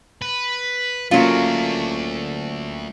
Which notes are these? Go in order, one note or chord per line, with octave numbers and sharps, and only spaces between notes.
B4
F#3 A3 A#3 C#4 D4 F4